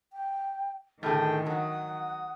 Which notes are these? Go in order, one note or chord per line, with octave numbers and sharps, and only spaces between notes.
G5
A2 D3 D#3 G#4 A4 G5
F#3 F#5 D#6